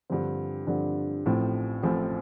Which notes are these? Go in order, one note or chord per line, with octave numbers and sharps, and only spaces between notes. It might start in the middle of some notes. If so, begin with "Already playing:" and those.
G2 D3 F3 C4
G2 D3 F3 C4
A1 A2 F3 C4
A1 A2 F3 C4